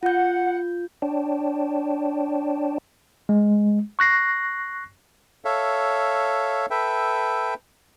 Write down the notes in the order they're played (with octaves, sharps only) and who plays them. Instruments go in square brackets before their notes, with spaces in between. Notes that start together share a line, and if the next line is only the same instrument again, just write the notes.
[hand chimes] F4 G6 [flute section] F#5
[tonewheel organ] D4 C#5 D5 G5 A5
[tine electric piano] G#3
C#6 F#6 A#6 C7
[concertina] A4 C#5 E5 F5
A4 B4 E5 G5